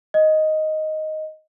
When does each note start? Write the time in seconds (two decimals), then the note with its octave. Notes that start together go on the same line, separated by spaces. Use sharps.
0.14 D#5